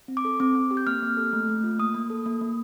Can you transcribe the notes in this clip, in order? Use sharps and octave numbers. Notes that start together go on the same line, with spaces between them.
C4
D6
A4
C4 D6
C4
G4
G6
A#3 F6
A#3
A4
A3
A3
F4
A#3 D#6
A#3
A4
A#3
A#3